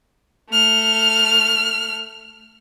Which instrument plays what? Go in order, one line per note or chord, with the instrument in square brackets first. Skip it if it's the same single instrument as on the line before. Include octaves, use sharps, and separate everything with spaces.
[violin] A3 F6